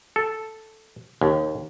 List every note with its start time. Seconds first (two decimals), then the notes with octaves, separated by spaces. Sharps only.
0.16 A4
1.21 D#2